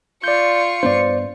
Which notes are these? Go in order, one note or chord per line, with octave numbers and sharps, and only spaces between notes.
F4 D5 C#6 G6
G2 B3 D4 C5 D5